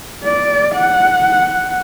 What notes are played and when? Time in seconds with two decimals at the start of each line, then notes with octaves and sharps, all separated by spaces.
0.24 D5
0.75 F#5